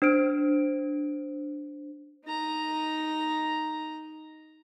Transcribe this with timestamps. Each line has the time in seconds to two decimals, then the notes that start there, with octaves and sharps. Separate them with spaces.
0.02 D4 C5 F6 D7
2.25 D#4 A#5